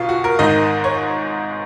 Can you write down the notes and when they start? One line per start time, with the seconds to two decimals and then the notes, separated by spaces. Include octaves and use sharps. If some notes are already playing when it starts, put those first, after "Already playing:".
Already playing: B1 B2 F4
0.09 F#4
0.24 A#4
0.39 G#1 G#2 D#3 D#5
0.84 C#5